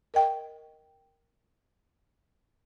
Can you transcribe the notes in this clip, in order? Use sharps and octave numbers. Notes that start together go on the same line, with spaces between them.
A#4 D#5 G5